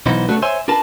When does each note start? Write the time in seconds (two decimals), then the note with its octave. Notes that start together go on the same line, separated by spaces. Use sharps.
0.06 B1 E3 B3 D#4 C5
0.29 C#3 A3 B3 D4 F#4 A4
0.42 C5 C#5 E5 G#5 C6
0.68 D4 F4 A#4 B4 A5